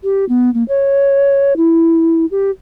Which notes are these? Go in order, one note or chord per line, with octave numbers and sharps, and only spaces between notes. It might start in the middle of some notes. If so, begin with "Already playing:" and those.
G4
B3
A#3
C#5
E4
G4